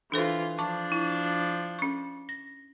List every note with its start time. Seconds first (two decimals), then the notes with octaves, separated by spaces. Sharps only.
0.12 E3 D4 F4 A4 C5
0.58 F3 D4 A5 C#6 D6
0.92 E4
1.79 C#4 C#6
2.29 A#6